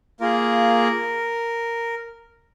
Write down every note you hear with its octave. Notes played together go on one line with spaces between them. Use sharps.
A#3 F4 G#4 A#4